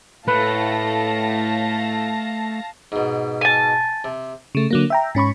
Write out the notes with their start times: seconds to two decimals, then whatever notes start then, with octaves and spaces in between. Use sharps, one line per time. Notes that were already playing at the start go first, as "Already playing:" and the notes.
0.28 A2 A3 B4 F5 A5 A#6
2.92 G#2 B2
3.41 G#5 A5
4.04 C3
4.55 C#3 A3
4.71 D3 F#3 A#3
4.90 E5 G5 A#5
5.15 G#2 C#4 B5 C#6